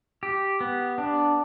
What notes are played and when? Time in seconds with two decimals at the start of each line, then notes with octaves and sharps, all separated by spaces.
0.23 G4
0.61 B3
0.98 D4